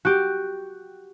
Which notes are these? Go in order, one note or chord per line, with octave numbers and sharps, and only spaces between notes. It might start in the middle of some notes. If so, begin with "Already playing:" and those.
F#4 G4